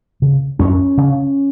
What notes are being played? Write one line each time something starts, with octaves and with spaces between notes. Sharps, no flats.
C#3
F#2 C#4
C#3